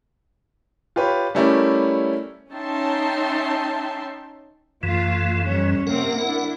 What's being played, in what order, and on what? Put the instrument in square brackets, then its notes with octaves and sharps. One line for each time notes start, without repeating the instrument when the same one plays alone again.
[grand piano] F4 G4 B4 C#5
G3 A3 C#4 E4 A#4 D5
[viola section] C#4 D#4 E5 G5 A5 C6
[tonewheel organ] F#2 E3 [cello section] A3 F4
[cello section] F2 G3 C#4
[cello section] C3 A#3 C4 [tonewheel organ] A#4 F#5
[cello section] D4 E4